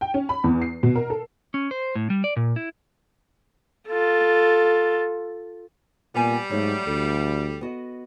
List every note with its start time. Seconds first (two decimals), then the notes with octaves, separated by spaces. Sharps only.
0.01 G5
0.14 C#4
0.29 B5
0.44 E2
0.62 C7
0.83 B2
0.96 A#4
1.10 A4
1.54 C#4
1.71 C5
1.95 A2
2.10 G3
2.24 D5
2.36 A#2
2.56 E4
3.88 F4 A4
6.14 A#2 G3 B3 G#5
6.50 G#2 F#3 A3
6.87 D2 A4
7.61 B3 F#4 D#5